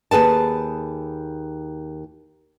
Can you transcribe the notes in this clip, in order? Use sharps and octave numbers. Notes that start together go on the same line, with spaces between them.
D#2 G#4 B4 A5